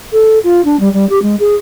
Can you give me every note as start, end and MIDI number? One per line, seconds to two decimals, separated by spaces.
0.13 0.39 69
0.44 0.61 65
0.65 0.79 62
0.80 0.91 55
0.93 1.08 55
1.10 1.22 67
1.22 1.36 56
1.40 1.55 68